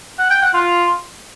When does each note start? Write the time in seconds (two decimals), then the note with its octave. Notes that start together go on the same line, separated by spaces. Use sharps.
0.19 F#5
0.30 G5
0.42 F#5
0.54 F4